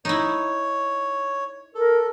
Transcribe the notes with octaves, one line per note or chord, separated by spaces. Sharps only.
D#4 E4 C#5
A4 A#4